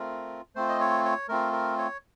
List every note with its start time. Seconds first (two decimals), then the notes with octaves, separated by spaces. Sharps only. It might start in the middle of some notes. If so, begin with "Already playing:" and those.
Already playing: A3 C4 F4 A#4
0.56 A3 C4 F4 C5
0.69 D#5
0.80 C#5
1.05 C#5
1.29 A3 C4 F4 A#4
1.53 A#4
1.78 C#5